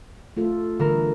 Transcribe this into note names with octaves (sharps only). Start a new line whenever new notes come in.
A3 F4 A4
D3 E3 G3 A#4